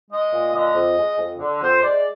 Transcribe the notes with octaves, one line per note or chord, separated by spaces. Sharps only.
G#3 D#5
A#2
D3 D#5
F2
G#3
F2
D3
F2 C5
G#3 D5